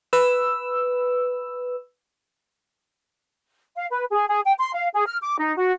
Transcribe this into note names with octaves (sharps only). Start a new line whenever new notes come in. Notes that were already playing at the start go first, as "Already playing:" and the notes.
B4 E6
F5
B4
G#4
G#4
G5
C6
F5
G#4
F6
D6
D#4
F#4